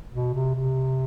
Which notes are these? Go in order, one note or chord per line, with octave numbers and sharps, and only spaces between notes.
B2
C3
C3